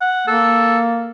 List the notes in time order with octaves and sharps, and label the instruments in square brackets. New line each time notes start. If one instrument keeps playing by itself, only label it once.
[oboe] F#5
[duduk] A#3 [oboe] A4